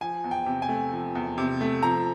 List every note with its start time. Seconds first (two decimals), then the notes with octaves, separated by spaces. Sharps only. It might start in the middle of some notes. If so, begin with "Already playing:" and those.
0.01 F3 G#5
0.24 E2
0.31 G5
0.46 C3
0.62 G#5
0.69 A3
0.92 F3
1.15 E2
1.38 C3
1.61 A3
1.83 F3 A#5